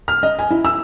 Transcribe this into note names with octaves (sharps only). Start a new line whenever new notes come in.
F6
D#5
G#5
E4
E6